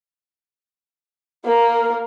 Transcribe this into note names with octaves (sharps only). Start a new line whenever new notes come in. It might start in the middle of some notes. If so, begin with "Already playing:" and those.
A#3 A#4